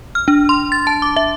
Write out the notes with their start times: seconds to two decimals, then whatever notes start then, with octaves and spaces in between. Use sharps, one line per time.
0.15 F6
0.28 D4
0.49 C6
0.72 A6
0.87 A5
1.02 D6
1.16 E5